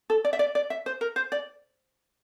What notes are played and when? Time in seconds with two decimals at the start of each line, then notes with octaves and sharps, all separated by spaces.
0.10 A4
0.25 D5
0.33 E5
0.39 D5
0.55 D5
0.70 E5
0.86 C5
1.01 A#4
1.16 C5
1.32 D5